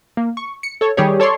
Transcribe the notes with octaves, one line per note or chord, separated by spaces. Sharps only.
A#3
C#6
C#7
A4 C#5
D#3 G3 G4 G#4 C#5
A4 C#5 D5 C6 C#6